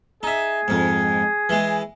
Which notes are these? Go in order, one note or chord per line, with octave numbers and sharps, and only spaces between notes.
D#4 G#4 E5
F2 G#2
E3 G#3